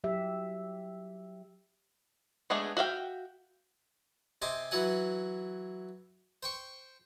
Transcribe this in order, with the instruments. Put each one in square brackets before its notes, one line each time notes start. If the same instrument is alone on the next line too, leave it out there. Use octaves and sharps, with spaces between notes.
[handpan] F#3 G4 E5
[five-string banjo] G#3 A3 B3 D4 G#4
F#4 E5 F5 G5
[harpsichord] C3 C5 D#5 G#5 D6
E3 F#3 F#5 G#5
C5 G5 C#6